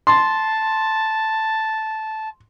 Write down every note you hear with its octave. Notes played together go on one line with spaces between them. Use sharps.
A5 C6